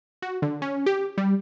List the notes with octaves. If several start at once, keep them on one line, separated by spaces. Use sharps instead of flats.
F#4
D3
C#4
G4
G3